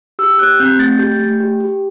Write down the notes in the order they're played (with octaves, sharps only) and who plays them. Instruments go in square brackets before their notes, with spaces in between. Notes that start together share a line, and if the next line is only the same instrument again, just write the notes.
[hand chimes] G4 E6
G4 F#6
C4 G6
A3 A6
G4 G6
A3
G4
G4